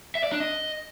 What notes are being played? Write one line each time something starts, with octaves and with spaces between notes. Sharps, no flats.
E5
D5
D4
D#5